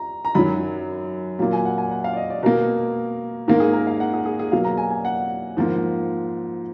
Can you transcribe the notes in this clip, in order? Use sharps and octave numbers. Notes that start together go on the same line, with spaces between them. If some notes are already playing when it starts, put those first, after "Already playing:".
Already playing: A#5
A#5
F#2 D#3 F#3 B5
A#2 F#3 A#3
G#5
F#5
G#5
F#5
F5
D5
D#5
D5
B2 A#3 A#4
G#2 D#3 A#3 A#4
G#4
A#4
F5
F#5
G#4
G#4
G#4
B2 F#3 A#3 F5
A#5
G#5
G#5
F#5
G#2 F3 A#3